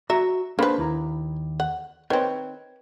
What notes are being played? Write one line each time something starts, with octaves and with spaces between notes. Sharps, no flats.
F#4 E5 A#5
A#3 D4 B4 C5 B5
D#2 E4 A#5
F#5
D#3 C4 B4 C#5 G5